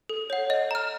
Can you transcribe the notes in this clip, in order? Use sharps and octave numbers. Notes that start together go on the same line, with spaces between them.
A4
C#5 F#5
D#5
A#5 F6